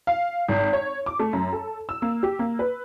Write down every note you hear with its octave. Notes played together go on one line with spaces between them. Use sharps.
F5
G#1
C#5
D6
A3
F#2
A4
E6
A#3
G4
A#3
B4